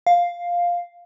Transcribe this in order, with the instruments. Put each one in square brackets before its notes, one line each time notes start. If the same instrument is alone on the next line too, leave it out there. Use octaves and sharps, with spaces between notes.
[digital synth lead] F5